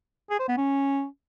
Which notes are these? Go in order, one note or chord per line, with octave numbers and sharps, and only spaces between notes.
G#4
C5
B3
C#4